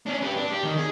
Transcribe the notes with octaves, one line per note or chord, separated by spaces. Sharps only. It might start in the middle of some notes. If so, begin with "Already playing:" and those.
C#4 D4
G4 B4
D4
G4
D#3
G#4